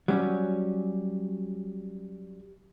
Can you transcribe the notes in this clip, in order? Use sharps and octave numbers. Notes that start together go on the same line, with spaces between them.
F#3 G3 C#4